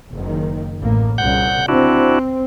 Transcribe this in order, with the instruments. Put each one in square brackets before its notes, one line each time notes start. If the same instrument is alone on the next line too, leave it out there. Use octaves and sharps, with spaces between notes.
[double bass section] F#1 D#3
A1 A2 A#3
[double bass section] C2 A#2 C#3 [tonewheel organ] F#5 G6
[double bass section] C4 [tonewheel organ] D4 E4 F#4